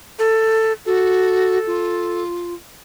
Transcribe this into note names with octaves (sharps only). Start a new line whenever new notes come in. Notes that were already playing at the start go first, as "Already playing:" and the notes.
A4
F#4 A4
F4